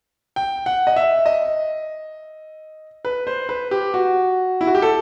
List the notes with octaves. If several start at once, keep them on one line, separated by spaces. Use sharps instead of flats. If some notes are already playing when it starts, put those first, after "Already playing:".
G5
F#5
D#5
E5
D#5
B4
C5
B4
G4
F#4
E4
F#4
G4
A4